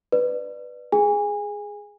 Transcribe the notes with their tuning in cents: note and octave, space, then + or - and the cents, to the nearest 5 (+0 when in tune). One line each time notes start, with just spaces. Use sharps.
B4 +0 D5 +20
G#4 +0 G#5 -25